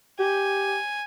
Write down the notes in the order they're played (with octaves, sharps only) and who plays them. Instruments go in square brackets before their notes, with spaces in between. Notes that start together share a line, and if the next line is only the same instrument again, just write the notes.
[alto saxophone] G4 [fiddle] G#5